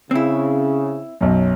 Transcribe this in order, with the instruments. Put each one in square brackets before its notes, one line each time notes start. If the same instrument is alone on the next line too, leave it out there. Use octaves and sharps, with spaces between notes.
[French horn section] C#3 [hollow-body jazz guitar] C4 E4
[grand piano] B1 F#2